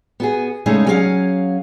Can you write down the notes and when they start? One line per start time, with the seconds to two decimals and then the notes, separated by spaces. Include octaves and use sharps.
0.20 B3 F#4 G#4
0.66 C#3 G#3 A3 C#4 D#4 G#4
0.87 F#3 C#4 G#4 C#5 F5 F#5